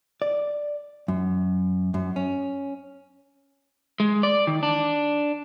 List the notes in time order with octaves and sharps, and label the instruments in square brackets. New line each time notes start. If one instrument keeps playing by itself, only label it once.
[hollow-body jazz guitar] D5
F#2
F#2
C#4
[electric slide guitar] G#3
D5
D#3
D4